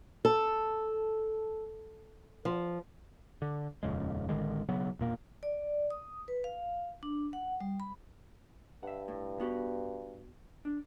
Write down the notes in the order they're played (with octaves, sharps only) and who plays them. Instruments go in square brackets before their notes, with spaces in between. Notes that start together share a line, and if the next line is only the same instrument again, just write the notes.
[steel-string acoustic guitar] A4
F3
[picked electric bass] D3
D#1 F2 C#3 G#3
A1 D3 D#3 G#3
B1 C#3 F#3 B3
E1 A#2 A#3
[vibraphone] D5
D#6
B4
F5
D4
F#5
G3
B5
[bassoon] G2 [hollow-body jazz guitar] E5 F#5
[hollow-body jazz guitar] A2
B3 F#4 G4
D4